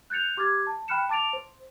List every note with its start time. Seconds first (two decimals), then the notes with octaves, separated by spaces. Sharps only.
0.10 F#6 G6 A6 C#7 F7
0.37 G4 D6 F6 G#6 A6
0.67 A5
0.88 G5 B5 F6 F#6 C#7 E7
1.09 A5 D6 A6 D7 F7
1.33 C5